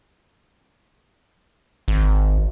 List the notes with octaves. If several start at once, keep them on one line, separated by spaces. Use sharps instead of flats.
G#1